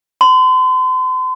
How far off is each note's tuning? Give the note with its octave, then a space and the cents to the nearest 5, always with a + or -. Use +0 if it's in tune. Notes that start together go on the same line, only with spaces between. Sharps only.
C6 -40